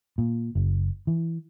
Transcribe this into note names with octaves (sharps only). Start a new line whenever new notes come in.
A#2
F#1
E3